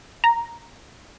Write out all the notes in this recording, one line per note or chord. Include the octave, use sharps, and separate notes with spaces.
A#5